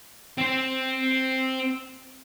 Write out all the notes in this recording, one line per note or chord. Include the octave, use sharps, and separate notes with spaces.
C4 C5